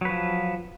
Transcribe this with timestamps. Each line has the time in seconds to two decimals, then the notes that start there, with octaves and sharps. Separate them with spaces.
0.01 F#3
0.05 B4
0.09 F3